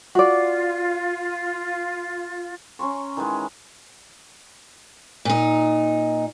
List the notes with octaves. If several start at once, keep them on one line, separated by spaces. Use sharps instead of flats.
F4 F#4 D5
C#4 A#5 C6 C#6
D#3 E3 G#3
A#2 D#4